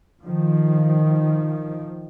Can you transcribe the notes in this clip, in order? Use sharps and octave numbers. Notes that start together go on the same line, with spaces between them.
D#3 F3